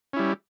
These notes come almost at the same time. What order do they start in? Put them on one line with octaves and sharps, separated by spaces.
C#4 E4 G3